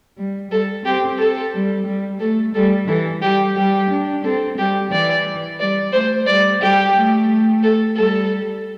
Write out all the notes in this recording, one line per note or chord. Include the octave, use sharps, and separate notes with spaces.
G3
G3 A4
C4 G4
A4
G3
G3
A3 A4
G3 A4
E3 A4
G3 G4
G3 G4
D4
C4 A4
G3 G4
E3 D5
G3 D5
A3 C5
G3 D5
G3 G4
A3
A4
G3 A4